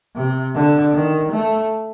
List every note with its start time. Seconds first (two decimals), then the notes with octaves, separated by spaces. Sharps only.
0.16 C3
0.55 D3
0.94 D#3
1.32 A3